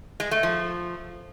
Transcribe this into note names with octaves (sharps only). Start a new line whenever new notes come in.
G#3
A3
F3